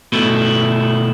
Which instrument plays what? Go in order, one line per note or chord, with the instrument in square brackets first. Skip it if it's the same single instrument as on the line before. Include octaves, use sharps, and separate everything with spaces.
[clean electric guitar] B2 A3 E4